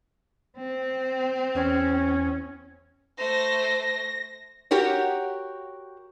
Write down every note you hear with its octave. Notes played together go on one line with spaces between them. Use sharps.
C4
E2 C#4
A3 C5 A#6
F#4 G4 A#4 C#5